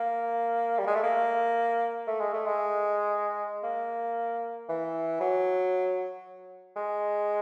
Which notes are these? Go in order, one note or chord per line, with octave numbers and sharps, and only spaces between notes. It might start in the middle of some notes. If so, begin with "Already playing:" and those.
Already playing: A#3
G3
G#3
A3
A#3
A3
G#3
A3
G#3
A#3
E3
F#3
G#3